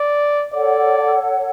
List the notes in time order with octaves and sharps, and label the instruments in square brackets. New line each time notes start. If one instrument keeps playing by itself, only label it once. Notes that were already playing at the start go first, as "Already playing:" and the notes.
Already playing: [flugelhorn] D5
[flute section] A4 C#5 F#5 [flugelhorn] D5